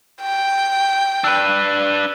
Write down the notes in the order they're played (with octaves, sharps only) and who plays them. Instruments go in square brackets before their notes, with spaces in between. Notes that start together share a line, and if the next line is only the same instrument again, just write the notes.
[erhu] G5
[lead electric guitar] D4 B4 [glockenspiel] E6 F#6